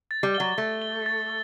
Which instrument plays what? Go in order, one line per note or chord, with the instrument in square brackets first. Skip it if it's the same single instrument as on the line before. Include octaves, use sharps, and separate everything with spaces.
[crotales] A6
[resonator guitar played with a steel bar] G3
[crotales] G7
[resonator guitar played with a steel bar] F#3
[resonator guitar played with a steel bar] A3 [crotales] A6
[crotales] G7
A6